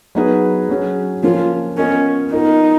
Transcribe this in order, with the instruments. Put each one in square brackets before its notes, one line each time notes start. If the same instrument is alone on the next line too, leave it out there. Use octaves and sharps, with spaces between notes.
[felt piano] F#3 B3 D#4 G#4 B4
F#3 C#4 G#4
[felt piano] F3 A#3 C#4 [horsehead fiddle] F4
[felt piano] B3 F4 A#4 D#5 [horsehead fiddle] C#4
[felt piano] B3 F4 A#4 D#5 [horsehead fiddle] D#4